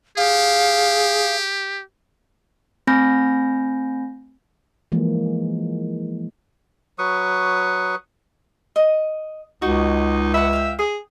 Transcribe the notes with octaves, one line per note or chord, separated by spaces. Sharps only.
G4 G#4 F5
A3 C4 G#5 B5 G6 A#6
E3 F3 G#3 A#3
F#3 B4 C#6 D#6
D#5
C#2 D#4 F#4
B4 E5 F#5
F5 G5
G#4 D#6